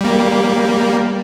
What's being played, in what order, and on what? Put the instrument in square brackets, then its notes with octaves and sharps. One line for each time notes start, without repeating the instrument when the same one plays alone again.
[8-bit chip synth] G3 A#3